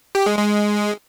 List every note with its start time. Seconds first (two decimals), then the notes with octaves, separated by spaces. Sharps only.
0.15 G4
0.26 G#3
0.38 G#3